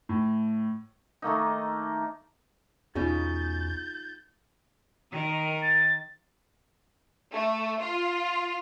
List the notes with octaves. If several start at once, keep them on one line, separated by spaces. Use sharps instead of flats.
A2
D#3 A3 A#3 D#4
E2 B2 C#4 D#4 F4 G#4 G6 A6
D#3 A#4
A6
A3
F4